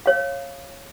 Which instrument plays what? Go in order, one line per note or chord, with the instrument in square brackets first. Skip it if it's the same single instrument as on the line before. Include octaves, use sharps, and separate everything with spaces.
[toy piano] C#5 F5